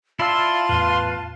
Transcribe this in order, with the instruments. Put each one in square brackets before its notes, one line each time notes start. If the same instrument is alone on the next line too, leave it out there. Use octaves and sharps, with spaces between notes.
[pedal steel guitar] E4 D5 E6 [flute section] F4 F5 A5 [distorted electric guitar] C6
[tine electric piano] E2 A2 [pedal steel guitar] B4